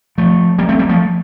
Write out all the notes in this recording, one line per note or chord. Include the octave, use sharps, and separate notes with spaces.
F3 A3
G3 A#3
A3 C4
G3 A#3
F3 A3